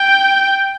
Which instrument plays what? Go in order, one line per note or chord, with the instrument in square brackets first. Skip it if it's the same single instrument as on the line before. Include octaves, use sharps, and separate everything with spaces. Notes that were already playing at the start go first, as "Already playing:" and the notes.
Already playing: [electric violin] G5